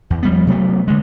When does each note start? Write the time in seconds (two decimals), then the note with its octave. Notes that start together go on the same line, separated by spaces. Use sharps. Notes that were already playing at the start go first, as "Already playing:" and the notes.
0.10 E2
0.23 F3 G3 B3
0.47 C3 F#3 A3 B3
0.88 D3 G#3